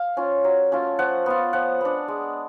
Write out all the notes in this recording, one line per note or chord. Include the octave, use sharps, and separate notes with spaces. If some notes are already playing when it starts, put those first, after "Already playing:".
Already playing: F5
C#4 F4
F#3
A3 C#4 F4
F3 F#5
B3 F4
F3 F#5
B3 D4
G#3